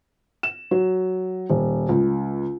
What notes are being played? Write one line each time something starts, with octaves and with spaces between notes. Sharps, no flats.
E7
F#3
D#1
C#2